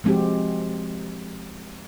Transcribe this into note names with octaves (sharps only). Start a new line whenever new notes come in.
F3 G#3 C4 F#4 G4